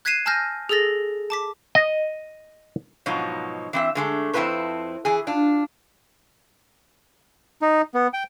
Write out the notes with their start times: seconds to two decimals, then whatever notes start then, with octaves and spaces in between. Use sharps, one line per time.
0.05 F#6 G#6 B6 C7 D#7 E7
0.26 G#5 A5 E6 F6 G6 A#6
0.69 G#4 A4 E6 A6 A#6
1.30 A5 D6 B6
1.75 D#5
3.06 G#2 B2 F3 F#3 D#4
3.73 E3 C4 E5
3.95 D3 G#3 A3
4.33 F2 C4 E4 G4 B4 C5
5.05 E3 G#4
5.27 D4 F4
7.62 D#4
7.94 B3
8.13 G5